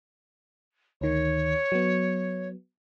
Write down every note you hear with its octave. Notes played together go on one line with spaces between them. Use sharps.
D2 D#3 C#5
F#3 B3